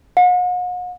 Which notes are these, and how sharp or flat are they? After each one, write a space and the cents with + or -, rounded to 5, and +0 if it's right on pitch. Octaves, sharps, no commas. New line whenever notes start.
F#5 -45